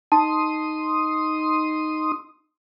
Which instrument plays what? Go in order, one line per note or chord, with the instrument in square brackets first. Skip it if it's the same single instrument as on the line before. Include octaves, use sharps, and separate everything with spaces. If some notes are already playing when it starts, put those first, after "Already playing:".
[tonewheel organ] D#4 C6 D#6 [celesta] A5